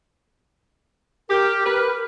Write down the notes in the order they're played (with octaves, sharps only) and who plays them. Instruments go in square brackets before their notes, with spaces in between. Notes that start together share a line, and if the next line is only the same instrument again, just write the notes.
[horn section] G4 [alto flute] A#4
[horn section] B4